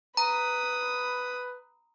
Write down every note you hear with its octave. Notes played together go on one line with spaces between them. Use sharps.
B4 A#5 B5 D#6